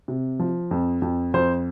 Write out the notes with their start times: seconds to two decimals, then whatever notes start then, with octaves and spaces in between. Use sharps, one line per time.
0.08 C3
0.39 F3
0.71 F2
1.02 F2
1.34 F2 C5